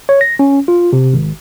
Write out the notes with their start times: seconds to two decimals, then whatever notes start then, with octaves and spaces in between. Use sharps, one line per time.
0.09 C#5
0.21 A#6
0.39 C#4
0.68 F4
0.93 C3
1.14 G#1